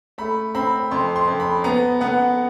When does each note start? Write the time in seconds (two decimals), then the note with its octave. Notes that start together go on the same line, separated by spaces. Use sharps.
0.18 A3 B5
0.55 C4 B5
0.91 F2 C6
1.16 C6
1.28 F2
1.40 B5
1.64 B3 A#5
2.01 B3 F#5